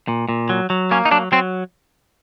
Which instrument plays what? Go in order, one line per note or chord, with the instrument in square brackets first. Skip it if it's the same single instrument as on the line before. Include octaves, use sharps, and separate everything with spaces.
[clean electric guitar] A#2
A#2
F#3
F#3
A#3 C#4
D#4
F#3 D4
F#3 C4